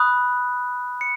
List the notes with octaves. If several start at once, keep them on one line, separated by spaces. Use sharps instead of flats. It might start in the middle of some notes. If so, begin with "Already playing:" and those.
Already playing: B5 D#6 F#6
C#7